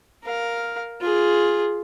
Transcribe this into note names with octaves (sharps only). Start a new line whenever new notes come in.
A#4 F5
F4 G#4